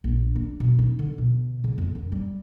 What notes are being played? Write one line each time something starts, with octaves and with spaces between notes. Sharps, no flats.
A#1
D4
B2
D#4
D3
B2
C#3
F2
F#2
G3